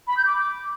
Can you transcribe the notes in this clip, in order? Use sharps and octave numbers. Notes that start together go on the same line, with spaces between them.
B5
G6
D6